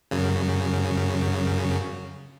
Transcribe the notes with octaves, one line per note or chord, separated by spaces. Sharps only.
F#2 C#3